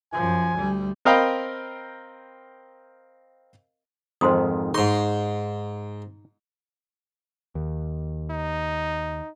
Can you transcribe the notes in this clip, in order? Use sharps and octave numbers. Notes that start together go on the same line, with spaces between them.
F#2 F3 G#5
D2 G3
C4 A#4 D#5 F5 G5 B5
F2 G#2 D#3 C5 C6 D#6
G#2 D#4 G#4 C6 C#6
D#2
D#4